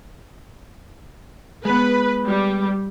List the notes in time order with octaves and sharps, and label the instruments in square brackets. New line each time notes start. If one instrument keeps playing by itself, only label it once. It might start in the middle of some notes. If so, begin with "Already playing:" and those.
[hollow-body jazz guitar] G#3 B3 [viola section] B4
[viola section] G3